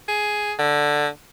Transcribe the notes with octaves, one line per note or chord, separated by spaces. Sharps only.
G#4
D3